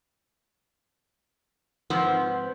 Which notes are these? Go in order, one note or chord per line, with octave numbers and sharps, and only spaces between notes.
G#2 F3 B3 C4